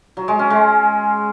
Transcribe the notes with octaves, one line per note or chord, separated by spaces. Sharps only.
F#3
G#3
C#4
G#3